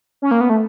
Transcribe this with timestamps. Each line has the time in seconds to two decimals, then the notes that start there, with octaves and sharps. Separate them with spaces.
0.22 C#4
0.31 A#3
0.41 B3
0.50 A3